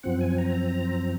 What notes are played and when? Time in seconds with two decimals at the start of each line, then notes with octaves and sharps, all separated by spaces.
0.03 F#2 F3 C4 F#5
0.21 G#5
0.38 A#5